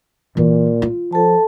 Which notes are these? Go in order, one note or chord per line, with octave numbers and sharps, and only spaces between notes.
A#2 E3
F4
F3 A4 A5